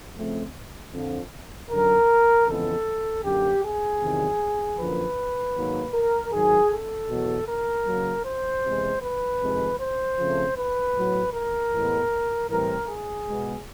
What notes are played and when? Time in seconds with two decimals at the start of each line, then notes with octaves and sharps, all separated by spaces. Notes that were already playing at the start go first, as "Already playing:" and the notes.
0.16 C#3 F3 A3 C4
0.93 F2 D3 F3
1.70 F#2 D3 F#3 A#4
2.47 F2 C#3 E3 G#3 B3 A4
3.24 F#2 D3 F#3 A#3 G4
3.63 G#4
4.01 E2 C3 D#3 F#3
4.79 F#2 D3 F3 A#3 B4
5.56 G#2 D#3 F#3 A#3
5.94 A#4
6.32 G#2 D#3 F#3 G#4
6.71 A4
7.10 E2 B2 F#3
7.48 A#4
7.87 C#3 F#3 A#3
8.25 C5
8.64 E2 C3 E3 G#3
9.02 B4
9.41 F2 C3 D#3 G#3
9.80 C5
10.18 C#3 F3 A3 C4
10.57 B4
10.96 A2 F#3 B3
11.34 A#4
11.73 A2 E3 G#3 B3
12.50 A2 E3 G3 C4 A#4
12.88 G#4
13.27 B2 G#3 B3